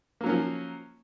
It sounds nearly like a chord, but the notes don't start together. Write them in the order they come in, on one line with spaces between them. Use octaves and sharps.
A#3 F#3 C#4 F3